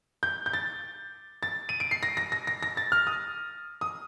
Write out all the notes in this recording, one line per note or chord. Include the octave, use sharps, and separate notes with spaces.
G6
G6
A6
A6
D#7
D7
C7
A#6
A#6
A#6
A#6
A#6
A6
F6
D#6
D#6